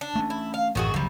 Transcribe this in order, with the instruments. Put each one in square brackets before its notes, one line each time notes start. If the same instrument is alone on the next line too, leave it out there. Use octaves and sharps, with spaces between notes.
[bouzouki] D4
[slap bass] A3 B3 C#4
[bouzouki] E4
F5
[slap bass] A1 F#2 [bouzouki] D#3 F#4 G#4
[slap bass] F#1 D2 F3 [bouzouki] C3 G3